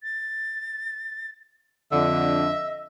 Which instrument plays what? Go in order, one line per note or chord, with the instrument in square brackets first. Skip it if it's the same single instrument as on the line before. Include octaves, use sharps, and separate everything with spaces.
[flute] A6
[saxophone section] F2 D3 [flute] D#5 [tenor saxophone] E5